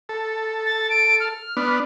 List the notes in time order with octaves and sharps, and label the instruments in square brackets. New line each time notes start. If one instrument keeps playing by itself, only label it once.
[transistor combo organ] A4
[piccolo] A6
D7
F6
[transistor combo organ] B3 D4